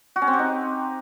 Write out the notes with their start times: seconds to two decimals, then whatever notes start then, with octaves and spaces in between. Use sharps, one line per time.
0.16 F#4
0.22 C#4
0.27 C4
0.33 G4
0.39 D#4